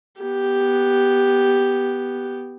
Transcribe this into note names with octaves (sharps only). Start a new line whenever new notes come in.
B3 G4